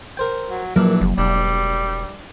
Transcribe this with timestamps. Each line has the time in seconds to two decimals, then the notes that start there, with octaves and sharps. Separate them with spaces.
0.17 A#4 C5 G5
0.50 F#3
0.76 A#1 E3 F#3 A#3 D4 A#4
1.01 F#1
1.18 E1 G3 D4